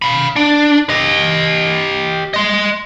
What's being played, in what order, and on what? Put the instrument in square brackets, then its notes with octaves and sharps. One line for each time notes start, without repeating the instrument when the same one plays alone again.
[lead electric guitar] F5 B5
D4
G4 D#5
D#5 C6